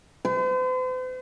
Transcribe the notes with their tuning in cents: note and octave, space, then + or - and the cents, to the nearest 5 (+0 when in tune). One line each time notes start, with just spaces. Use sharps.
C5 -45